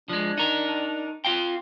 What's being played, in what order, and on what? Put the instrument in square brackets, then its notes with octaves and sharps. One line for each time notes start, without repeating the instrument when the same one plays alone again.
[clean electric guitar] F3 G#3 [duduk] D4
[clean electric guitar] D#4 A#4
F4 F5 G5